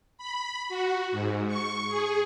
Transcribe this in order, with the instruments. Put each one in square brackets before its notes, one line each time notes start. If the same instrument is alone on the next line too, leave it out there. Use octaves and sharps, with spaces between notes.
[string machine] B5
F#4
G#2
C#6
G#4